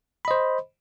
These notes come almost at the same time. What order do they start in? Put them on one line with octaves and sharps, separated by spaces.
B5 D#5 C5